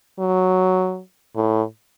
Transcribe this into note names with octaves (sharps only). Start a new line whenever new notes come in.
F#3
A2